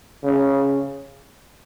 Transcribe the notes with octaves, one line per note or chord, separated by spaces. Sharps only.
C#3